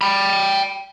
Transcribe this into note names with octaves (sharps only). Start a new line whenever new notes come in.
G5 B5